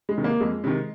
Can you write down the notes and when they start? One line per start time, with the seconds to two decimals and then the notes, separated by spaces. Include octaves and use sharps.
0.09 G#3
0.18 C3 D#3
0.24 A#3
0.40 F2 G#3
0.64 C3 D#3